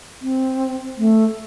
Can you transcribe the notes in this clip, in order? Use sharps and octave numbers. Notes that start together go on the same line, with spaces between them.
C4
A3